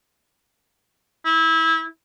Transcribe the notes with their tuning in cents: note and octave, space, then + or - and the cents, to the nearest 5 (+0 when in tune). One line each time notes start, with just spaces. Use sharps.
E4 -20